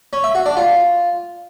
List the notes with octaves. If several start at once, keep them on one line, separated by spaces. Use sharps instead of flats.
C#4
E5
F#4
D4
F4